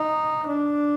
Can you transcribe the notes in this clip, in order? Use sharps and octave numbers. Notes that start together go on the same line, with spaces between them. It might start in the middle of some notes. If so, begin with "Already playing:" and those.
Already playing: D#4
D4